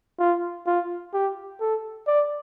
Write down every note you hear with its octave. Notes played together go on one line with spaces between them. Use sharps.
F4
F4
G4
A4
D5